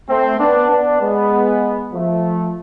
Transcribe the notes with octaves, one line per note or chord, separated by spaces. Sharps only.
A3 C4
B3 D4
B3 D4
G#3 B3
F3 A3